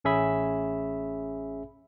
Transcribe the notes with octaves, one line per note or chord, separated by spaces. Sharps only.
A1 C#4 G#4 E5 B5